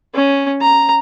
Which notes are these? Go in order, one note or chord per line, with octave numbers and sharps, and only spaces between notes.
C#4
A#5